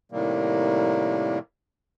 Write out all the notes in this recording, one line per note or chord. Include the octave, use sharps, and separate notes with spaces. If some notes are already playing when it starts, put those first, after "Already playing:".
A2 C3 D#3 G3 A#3